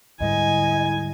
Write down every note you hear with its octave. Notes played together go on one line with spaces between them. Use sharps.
D2 G#2 D3 G3 E4 D#5 G#5